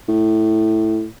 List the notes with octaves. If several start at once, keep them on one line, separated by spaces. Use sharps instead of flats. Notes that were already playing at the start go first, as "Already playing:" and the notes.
A2